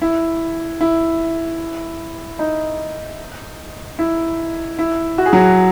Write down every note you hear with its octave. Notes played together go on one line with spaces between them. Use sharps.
E4
E4
D#4
E4
E4
F#4
G#4
F#3 F#4